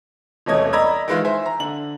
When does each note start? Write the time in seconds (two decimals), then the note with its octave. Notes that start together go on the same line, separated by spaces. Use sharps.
0.46 E1 C2 A3 C#4 D#5 G#6
0.73 D5 D#5 A#5 B5 E6 G#6
1.08 D#3 E3 G#3 F4
1.25 C5 E5 G#5
1.46 A#5
1.60 D3 F#7